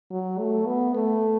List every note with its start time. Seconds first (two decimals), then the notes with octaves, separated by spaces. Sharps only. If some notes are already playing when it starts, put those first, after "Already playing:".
0.11 F#3
0.39 A3
0.67 B3
0.95 A3